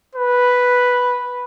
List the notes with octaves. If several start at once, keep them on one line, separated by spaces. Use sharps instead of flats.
B4